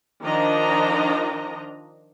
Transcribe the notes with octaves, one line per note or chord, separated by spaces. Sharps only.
D#3 F3 D4 D#5 A#5